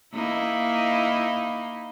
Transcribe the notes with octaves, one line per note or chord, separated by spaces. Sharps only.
A#3 D#4 E4